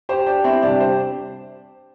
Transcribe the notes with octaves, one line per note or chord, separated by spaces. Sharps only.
G4 C5
D4 G4
C4 E4
C3 G3 D4 G4
G4 C5